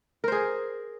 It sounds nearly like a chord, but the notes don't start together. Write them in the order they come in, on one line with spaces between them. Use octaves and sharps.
A#4 C5 G#4